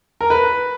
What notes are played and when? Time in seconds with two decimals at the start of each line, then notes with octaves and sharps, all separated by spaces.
0.21 A#4
0.30 B4